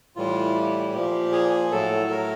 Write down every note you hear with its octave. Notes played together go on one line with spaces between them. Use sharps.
A2 E3 G3 F4
G4
A#2 F3 G4
G#4
A2 F#3 A4
A#4